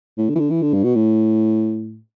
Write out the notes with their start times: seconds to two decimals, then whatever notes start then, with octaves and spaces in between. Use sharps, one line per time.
0.18 A2
0.29 D3
0.35 E3
0.39 D3
0.50 E3
0.62 D3
0.74 G2
0.84 B2
0.95 A2